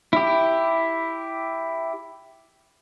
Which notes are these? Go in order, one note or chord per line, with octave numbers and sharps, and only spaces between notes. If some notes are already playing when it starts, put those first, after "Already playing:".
E4 G4